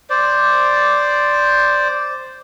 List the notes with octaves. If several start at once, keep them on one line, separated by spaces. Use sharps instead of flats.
C5 D5